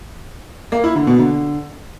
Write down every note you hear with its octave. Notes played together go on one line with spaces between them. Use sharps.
A#3
E4
D3
B2
D3